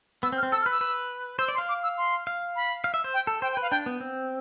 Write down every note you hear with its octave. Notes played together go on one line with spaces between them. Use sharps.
B3 E6
C4
F6
C4
A4 E6
F6
B4
E6
B4
C5 E6
D5
C6
F5
D6
E6
C6
F5
B5
F5
E5
C5
G5
A4
C5 G5
G5
B4 F5
D4 G5
B3
C4